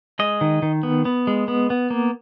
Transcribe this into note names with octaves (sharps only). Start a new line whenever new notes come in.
G#3 D#5
D#3
D#3
B3
B3
G#3
B3
B3
A#3